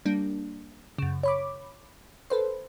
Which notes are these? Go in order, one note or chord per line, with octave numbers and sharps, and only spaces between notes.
G3 A#3 D4
F#2 C#3
C#5 B5 D6
A4 B4 C5